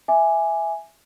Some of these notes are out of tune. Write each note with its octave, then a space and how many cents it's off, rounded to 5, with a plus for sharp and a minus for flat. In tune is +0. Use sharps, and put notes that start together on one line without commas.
E5 +0 G#5 +0 D6 +0